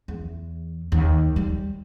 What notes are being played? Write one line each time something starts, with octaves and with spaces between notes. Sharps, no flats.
E2
D#2
G3